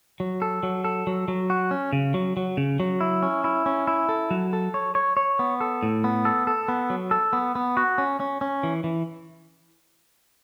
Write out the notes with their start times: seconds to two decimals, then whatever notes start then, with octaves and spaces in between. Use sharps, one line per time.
0.20 F#3
0.42 A4
0.63 F#3
0.84 A4
1.07 F#3
1.28 F#3
1.50 F#4
1.71 C#4
1.93 C#3
2.14 F#3
2.37 F#3
2.57 C#3
2.80 F#3
3.01 E4
3.23 C#4
3.44 E4
3.66 C#4
3.87 E4
4.09 A4
4.31 F#3
4.53 A4
4.74 C#5
4.95 C#5
5.17 C#5
5.39 B3
5.61 A4
5.83 A2
6.04 B3
6.25 A4
6.47 A4
6.68 B3
6.90 F#3
7.11 A4
7.33 B3
7.55 B3
7.77 F#4
7.98 C#4
8.20 C#4
8.41 C#4
8.63 E3
8.84 E3